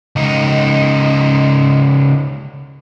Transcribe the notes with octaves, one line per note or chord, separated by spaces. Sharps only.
C#2 D#4